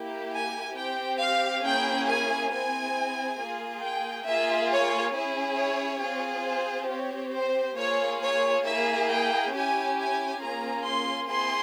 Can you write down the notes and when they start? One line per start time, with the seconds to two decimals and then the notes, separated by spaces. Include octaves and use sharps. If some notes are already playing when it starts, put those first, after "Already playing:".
Already playing: A#3 E4 G4
0.33 G#5
0.77 C4 G4 G5
1.21 F5
1.64 A#3 C#4 E4 G#4 G5
2.08 G#5
2.52 C4 E4 G#4 G#5
3.40 A#3 F4 G#4
3.83 G5
4.28 A#3 F4 G#4 E5
4.71 C#5
5.15 C#4 E4 G#4
5.59 C#5
6.03 C4 F4 G#4
6.46 C5
6.90 C4 G4 C#5
7.34 C5
7.78 A#3 F4 G#4 C#5
8.22 C#5
8.66 A#3 E4 G#4 E5
9.10 G5
9.54 C#4 E4 G4 G#5
9.97 G#5
10.41 A#3 C#4 F4 G#4 A#5
10.84 C6
11.29 C4 E4 G#4 C6